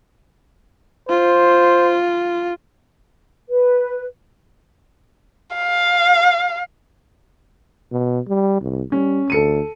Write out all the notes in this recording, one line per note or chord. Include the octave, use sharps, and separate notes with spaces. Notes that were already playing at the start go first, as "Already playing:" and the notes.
F4 C5
B4
F5
B2
G3
C2
G3 C#4
D2 A4 C#7 D#7